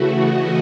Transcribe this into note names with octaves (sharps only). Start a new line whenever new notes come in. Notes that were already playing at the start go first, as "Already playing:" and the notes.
Already playing: C#3 E3 A3 F#4
D#5